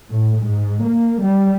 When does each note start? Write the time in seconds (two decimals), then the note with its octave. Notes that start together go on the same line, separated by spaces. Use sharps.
0.10 A2
0.42 G#2
0.83 A#3
1.20 G3